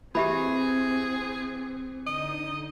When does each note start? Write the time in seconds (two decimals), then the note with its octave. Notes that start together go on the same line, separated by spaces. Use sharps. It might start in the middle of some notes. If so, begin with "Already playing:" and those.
0.15 E3 C4 G4 G#4 E5 B5
2.07 D3 D#4 D#5